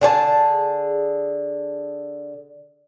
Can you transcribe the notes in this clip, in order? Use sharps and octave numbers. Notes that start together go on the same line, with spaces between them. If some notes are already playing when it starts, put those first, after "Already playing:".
D3 G#4 C#5 A5